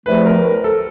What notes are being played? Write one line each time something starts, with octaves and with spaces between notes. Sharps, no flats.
E2 C3 F3 A3 B4
A#4
A#4
A4